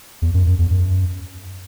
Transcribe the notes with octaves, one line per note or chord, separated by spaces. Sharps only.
E2
F#2
F#2
E2
F#2